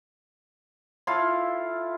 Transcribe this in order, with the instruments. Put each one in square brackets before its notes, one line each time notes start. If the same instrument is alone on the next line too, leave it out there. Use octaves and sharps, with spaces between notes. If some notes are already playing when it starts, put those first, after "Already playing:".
[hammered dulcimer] E4 F4 A4 F5